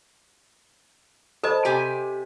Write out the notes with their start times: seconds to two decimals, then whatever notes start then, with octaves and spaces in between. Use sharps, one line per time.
1.43 A4 C5 D#5 A5
1.65 C3 G4 G#5